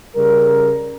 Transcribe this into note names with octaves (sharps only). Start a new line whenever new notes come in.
C#3 G3 A#4